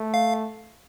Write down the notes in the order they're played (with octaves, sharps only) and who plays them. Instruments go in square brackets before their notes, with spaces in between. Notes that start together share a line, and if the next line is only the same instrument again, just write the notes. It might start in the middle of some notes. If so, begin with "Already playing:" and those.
Already playing: [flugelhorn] A3
[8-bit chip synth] F5